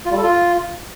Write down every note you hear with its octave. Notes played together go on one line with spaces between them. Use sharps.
F4
G3
A4
F4